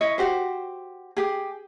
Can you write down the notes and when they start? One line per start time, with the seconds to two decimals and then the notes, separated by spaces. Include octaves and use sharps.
0.01 E4 C#5 D#5
0.18 F#4 G4 C5
1.17 G4 G#4